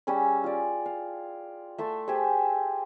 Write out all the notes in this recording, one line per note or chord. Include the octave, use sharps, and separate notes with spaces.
G3 C#4 G#4 E6
F4 D5
F5
A3 E5 A5 C6
G4 G#4 C5 E5